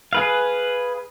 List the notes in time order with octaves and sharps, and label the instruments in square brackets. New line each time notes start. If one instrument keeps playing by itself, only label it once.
[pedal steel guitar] G#4 B4 F5